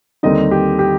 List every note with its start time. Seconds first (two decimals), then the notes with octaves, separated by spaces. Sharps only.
0.23 D#2 D3 G3 C4 D#4 D#5
0.51 G4
0.79 G4